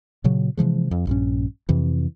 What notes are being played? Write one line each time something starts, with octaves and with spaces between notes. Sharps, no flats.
A#2 C#3 F#3
C3 E3 F3 G#3
F2
A#1 G2 C#4
F2 C3 E3